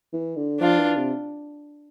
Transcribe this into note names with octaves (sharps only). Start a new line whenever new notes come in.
E3
D3
F3 D4 F4
E3
C3